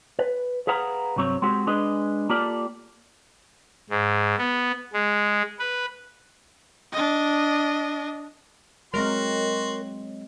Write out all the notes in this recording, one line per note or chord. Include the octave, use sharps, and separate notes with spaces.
B4
G#4 B4 F5 F#5 A#5
C2 G2 F#3 C4 C#5
G#3 C4 F#4 G4
G#3 D4 G#4 B4 D#5
A#3 F4 G4 A4 D5
G#2
B3
G#3
B4
D4 D#5
F#3 G#3 C4 F#4 A#4 C6